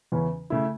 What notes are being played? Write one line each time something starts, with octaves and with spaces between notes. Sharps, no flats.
E2 C#3 E3 C#4
C#3 A3 E4